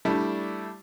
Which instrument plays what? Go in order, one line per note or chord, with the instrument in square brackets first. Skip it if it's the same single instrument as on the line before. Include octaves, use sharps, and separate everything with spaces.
[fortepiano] G3 A3 D4 E4